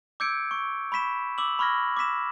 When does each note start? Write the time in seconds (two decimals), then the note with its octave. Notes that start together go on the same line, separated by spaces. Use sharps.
0.20 D6 E6 G6 G#6 C#7 D7
0.51 C#6
0.92 B5 C#6 B6 E7
1.38 D6 E6 F#7
1.59 B5 C#6 F6 G#6 A#6
1.97 D6 E6 B6 E7